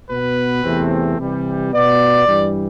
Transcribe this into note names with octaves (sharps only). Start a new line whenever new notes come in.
B2 B3 B4
E2 C3 E3 A3 C4
C3 E3 G3
B2 B3 D5
G2 E3 G3